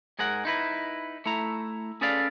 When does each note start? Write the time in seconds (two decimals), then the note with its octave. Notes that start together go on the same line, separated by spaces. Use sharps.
0.19 G#2 G#4 A#4 F#5
0.45 D#4 E4 B4
1.26 A3 E4 A#5
2.01 C#4 G#4 A4 B4 D5 F5